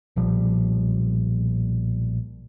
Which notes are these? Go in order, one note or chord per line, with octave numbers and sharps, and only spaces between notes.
B1 A#2 F3 G3